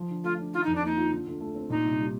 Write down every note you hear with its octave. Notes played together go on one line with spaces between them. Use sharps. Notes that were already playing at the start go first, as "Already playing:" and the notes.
Already playing: F3
D3
A3 F4
D4
D#3 F4
F2 D#4
D4
A#3 D#4
F4
D3
D2
A3
C4
A#2 D#4
C2
G3